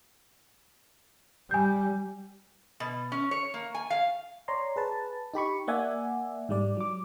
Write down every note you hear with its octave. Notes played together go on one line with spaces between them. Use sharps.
G3 G#5 G6
B2
C#4
C#5
A#3
G#5
F5
C#5 D5 A#5 C6
G#4 B4 A5
D#4 G4 B5 C#6
A#3 D5 E5 F#5 G#5
G#2 G3 D5
F#3 D6